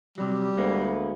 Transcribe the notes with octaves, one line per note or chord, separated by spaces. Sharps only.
C3 F#3 G3
D2 G#3 A#3 B3